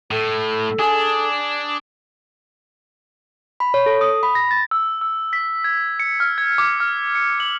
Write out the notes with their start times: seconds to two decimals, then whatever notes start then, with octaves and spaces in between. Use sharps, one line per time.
0.11 A2 A4
0.79 D4 G#4
3.60 B5
3.74 C#5
3.86 A4
4.01 D#6
4.23 B5
4.35 A#6
4.51 A6
4.71 E6
5.01 E6
5.33 B6
5.64 G#6
6.00 C#7
6.20 F6
6.38 G#6
6.58 D6
6.80 F6
7.15 C#7
7.40 F#7